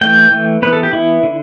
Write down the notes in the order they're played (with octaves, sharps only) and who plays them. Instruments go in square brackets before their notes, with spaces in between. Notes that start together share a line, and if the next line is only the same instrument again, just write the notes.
[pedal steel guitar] E3 A3 G5
E3 A3
E3 B3 B4
A4
G4
E3 B3 E4
D3